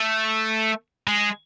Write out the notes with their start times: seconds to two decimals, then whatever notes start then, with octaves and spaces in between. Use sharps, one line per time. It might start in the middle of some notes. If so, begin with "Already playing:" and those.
Already playing: A3
1.07 G#3